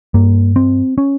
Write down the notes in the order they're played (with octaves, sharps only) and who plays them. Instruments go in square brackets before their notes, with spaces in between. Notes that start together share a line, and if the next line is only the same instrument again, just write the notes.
[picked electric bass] G2 A#3
C4
C#4